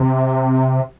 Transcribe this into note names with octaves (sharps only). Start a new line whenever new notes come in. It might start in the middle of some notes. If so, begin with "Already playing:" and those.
Already playing: C3